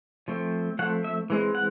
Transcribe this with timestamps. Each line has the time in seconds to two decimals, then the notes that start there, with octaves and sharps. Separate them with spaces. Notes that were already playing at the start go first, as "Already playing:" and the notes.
0.28 F3 A3 C4
0.79 F3 A3 C4 F#5
1.04 E5
1.30 E3 G#3 C4
1.55 F#5